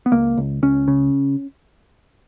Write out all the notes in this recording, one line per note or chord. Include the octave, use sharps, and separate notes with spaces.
B3
C#2 A#3
C#2
C#2 C#4
C#3